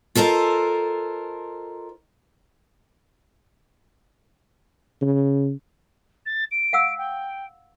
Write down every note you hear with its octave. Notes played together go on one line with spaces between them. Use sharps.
F4 A4 A#4 C5 D#5
C#3
A6
D7
F5 F#5 E6
G5